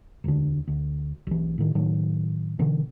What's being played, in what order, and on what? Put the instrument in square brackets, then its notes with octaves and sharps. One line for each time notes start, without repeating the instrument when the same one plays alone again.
[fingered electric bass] E1 D2 D3
D2
B1 E3
A2 D#3
A2 D#3 F#3
B2 D3 E3